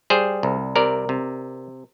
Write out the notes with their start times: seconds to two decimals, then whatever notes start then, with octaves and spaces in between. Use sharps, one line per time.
0.10 G3 G#4 C5
0.43 C2
0.76 C3 A#4 D5
1.09 C3